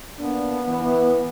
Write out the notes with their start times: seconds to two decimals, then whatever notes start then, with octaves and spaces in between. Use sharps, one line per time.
0.19 A#3 B3 D4
0.67 E3